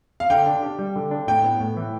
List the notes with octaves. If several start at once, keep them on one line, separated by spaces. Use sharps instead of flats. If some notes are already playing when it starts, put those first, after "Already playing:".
F5
D3 G5
D4
G4
G3
D3
D4
A2 G5
B3
A2
E3